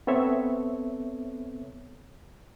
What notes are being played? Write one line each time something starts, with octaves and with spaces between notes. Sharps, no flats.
B3 C4 A4 C#5 E5